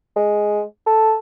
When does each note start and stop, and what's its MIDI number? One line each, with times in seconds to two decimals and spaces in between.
0.16 0.62 56
0.87 1.16 69